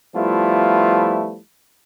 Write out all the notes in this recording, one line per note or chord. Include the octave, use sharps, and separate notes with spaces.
F3 G3 A3 B3 E4 F4